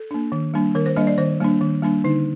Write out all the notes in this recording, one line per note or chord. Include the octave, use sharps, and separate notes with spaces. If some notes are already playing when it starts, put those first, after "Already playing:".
Already playing: A4
A#3 D4
D#3
G3 A#3 D4
D#3 A#4
C5
G3 A#3 D4 D#5
D5
D#3 C5
G3 A#3 D4
D#3
G3 A#3 D4
D3 D#4